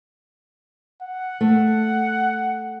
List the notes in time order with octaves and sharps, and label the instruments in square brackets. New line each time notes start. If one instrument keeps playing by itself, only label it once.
[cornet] F#5
[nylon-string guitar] A3